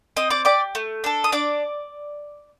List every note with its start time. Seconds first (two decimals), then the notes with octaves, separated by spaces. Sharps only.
0.17 C4 D#5 D#6
0.30 D5 D6
0.45 G4 D5 D6
0.75 A3
1.04 D4 A4
1.24 D#6
1.32 D4 D5 D6